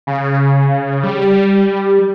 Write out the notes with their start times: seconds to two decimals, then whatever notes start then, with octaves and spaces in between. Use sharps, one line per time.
0.07 C#3
1.03 G3